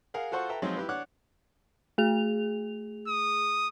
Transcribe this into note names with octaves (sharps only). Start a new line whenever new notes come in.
G#4 A#4 F5 F#5
F4 F#4 A4 C5 F#5 C#6
A4 B4 E5 G5 A#5
F3 F#3 G#3 C4 D#4 F4
E4 G4 B4
D4 C#5 F#5 D6 F#6
A3 G#4 F7
D#6